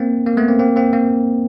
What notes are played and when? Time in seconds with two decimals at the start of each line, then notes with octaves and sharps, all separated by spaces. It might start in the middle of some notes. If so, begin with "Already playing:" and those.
Already playing: A#3 C4
0.27 A#3
0.37 A3 B3
0.48 A#3 C4
0.59 A#3 C4
0.76 A#3 C4
0.93 A#3